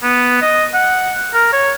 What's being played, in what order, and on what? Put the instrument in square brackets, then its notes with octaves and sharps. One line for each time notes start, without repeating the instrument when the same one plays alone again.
[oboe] B3
D#5
F#5
A#4
C#5